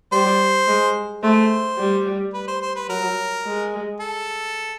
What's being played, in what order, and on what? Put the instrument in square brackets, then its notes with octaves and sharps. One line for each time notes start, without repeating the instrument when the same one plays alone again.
[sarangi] G3 [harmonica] C5
[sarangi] G#3
[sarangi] A3 [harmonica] C5
[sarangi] G3
[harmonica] B4
C5
C5
B4
[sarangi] F#3 [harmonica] A#4
[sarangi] G#3
[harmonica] A4